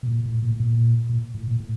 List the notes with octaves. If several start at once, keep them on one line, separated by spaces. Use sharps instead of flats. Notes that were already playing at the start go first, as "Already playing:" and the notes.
B2
A#2
A2
A#2
A2
A#2
A#2
A2
A#2
A2